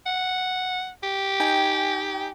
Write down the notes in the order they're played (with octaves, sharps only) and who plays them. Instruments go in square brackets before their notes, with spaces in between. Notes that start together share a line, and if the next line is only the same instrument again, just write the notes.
[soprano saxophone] F#5
G4
[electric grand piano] D#4 G5 G#5